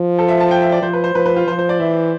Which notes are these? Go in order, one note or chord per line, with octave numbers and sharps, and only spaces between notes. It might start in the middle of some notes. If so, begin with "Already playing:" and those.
Already playing: F3
A4
E5
A5
G5
E5
D5
F3 C5
B4
C5
F3 B4
B4
F4
F3 C5
C5
D5
E3 E5